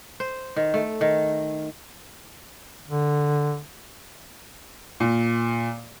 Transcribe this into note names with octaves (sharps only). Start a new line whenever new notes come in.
C5
D#3
A3
D#3
D3
A#2